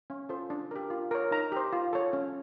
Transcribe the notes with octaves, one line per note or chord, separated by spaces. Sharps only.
C#4
F4 A4 C5
D4
G4 A#4
F4
A#4 C#5
D#4 A#5
G4 C5
F4
A4 C#5
C#4